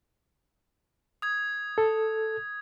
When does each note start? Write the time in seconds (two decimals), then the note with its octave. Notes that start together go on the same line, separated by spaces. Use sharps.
1.22 D#6 G#6
1.78 A4